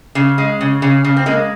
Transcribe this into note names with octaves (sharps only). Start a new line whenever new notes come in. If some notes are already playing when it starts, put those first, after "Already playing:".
C#3
G#3
C#3
C#3
C#3
C4
G#3 A#3